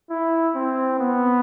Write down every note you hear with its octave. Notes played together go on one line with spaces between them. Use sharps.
E4
C4
B3